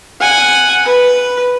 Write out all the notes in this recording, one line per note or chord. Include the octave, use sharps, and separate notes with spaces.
F#5 G#5
B4